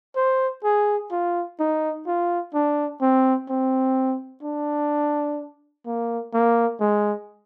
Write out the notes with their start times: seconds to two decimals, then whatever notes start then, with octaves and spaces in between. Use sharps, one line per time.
0.16 C5
0.64 G#4
1.11 F4
1.60 D#4
2.07 F4
2.54 D4
3.01 C4
3.49 C4
4.43 D4
5.86 A#3
6.34 A#3
6.80 G#3